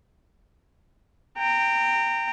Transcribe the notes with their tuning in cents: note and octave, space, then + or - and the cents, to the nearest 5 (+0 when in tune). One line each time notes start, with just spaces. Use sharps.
G5 +5 A#5 -25